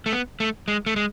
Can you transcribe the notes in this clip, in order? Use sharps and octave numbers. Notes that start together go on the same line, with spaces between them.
A3
B3
A3
G#3
A3
G#3